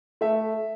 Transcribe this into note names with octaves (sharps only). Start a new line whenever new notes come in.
A3 E5